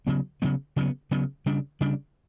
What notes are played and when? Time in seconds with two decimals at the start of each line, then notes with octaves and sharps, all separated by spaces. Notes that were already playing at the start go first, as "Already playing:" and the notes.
0.07 C#3 F#3 B3
0.42 C#3 F#3 B3
0.76 C#3 F#3 B3
1.11 C#3 F#3 B3
1.46 C#3 G3 D4
1.81 C#3 G3 D4